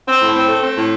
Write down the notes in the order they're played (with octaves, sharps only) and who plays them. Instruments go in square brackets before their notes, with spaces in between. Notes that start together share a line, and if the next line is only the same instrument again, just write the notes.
[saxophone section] C4
A2
C4
A3
C4
A2